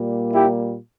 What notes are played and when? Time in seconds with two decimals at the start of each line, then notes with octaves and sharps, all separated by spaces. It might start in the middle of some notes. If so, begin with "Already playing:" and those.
Already playing: A#2 G3 A#3
0.33 E4 G4